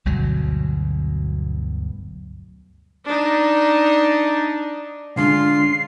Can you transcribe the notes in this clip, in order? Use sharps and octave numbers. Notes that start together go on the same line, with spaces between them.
G1 D2 B2 F#3
D4 D#4
D3 G#3 C#4 D4 F4 C7